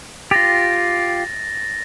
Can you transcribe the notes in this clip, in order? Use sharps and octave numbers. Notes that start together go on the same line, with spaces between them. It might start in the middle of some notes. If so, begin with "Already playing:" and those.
F4 G4 A6 A#6